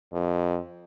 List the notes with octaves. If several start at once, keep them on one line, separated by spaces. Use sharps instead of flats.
F2